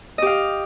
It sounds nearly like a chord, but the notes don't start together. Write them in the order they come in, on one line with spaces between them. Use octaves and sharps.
D#5 G4 F5